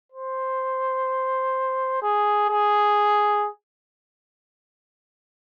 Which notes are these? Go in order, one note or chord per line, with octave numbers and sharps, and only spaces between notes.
C5
G#4
G#4